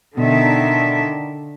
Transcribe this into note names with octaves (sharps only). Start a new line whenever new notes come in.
B2 D3 D#3 E5